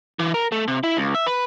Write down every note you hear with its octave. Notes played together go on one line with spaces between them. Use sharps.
E3
A#4
A3
C3
E4
C#2
E5
B4